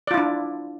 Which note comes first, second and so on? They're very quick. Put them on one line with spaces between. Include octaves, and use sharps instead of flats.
D5 F4 E4 D4